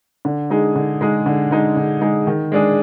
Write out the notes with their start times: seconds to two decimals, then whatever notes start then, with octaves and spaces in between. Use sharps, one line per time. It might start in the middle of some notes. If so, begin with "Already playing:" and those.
0.25 D3
0.50 G#3 D#4 G#4
0.75 D3
1.01 G#3 D#4 G#4
1.26 D3
1.51 G#3 D#4 G#4
1.77 D3
2.01 G#3 D#4 G#4
2.27 D#3
2.52 G#3 D4 G#4